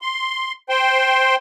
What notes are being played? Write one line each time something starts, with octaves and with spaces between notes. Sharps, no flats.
C6
C5 G5 C6